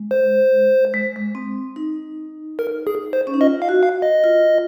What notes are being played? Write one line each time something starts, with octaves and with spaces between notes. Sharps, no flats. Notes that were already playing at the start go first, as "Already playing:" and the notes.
Already playing: G#3
C5
G#3
G#3
C4
D#4
A#4
G#4
C5
C#4
D#4
F4 D#5
F5
F#4
F5
D#5
F4